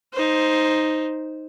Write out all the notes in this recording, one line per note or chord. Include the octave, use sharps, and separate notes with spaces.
D#4 C5